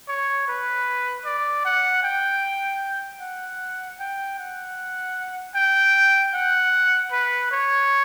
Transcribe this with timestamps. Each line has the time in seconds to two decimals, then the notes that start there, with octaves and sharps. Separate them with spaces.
0.08 C#5
0.48 B4
1.25 D5
1.65 F#5
2.03 G5
3.21 F#5
4.00 G5
4.39 F#5
5.55 G5
6.34 F#5
7.12 B4
7.52 C#5